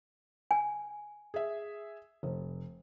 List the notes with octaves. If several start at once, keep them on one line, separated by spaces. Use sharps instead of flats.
G#5
G#4 E5
F1